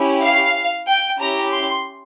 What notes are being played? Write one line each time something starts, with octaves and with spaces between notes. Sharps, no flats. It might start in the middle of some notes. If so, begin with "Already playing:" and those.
Already playing: C#4 E4 G4
F5
G5
C#4 E4 G4 A#5
C6